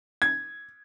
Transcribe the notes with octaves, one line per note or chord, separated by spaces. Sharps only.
G#6